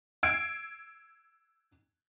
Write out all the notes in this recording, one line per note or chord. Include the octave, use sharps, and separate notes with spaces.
E6 G#6 C7 D7